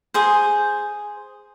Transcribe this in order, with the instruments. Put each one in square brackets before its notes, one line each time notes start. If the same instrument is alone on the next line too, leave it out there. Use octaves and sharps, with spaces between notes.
[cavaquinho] G#4 C5